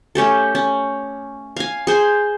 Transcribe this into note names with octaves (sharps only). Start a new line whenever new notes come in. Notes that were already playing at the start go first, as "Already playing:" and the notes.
A3 C#4 G4 A4
C#4
F5 G#5
G#4 C5 G#5